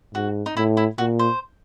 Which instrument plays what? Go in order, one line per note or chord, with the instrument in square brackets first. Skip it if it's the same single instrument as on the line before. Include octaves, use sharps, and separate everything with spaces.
[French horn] G#2 [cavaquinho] F#4
[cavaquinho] D#4
[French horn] A2 [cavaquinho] E4
[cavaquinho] E4
[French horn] A#2 [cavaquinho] F#4
[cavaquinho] C5